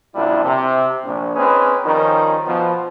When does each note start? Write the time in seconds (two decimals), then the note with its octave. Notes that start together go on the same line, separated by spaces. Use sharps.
0.16 F#2 A#2 F3 G3 D4 E4
0.45 C3
1.05 A#1
1.36 C4 C#4 D#4 G#4 B4
1.85 D#3 F3 G3 C#4 D#4 A#4
2.46 B2 F3